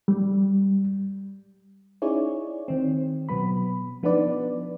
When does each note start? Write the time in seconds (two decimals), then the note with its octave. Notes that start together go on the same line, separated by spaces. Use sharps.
0.08 G3
2.02 C#4 D#4 E4 G#4 C#5 D5
2.68 D#3 C4
3.29 B2 F#3 B3 B5
4.03 F3 B3 D4 D#4 B4 D5